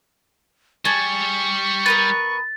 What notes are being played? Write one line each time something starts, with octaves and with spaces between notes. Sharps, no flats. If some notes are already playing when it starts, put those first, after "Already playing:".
G3 G#4 A5 C#6
B3 A#4 B4 A6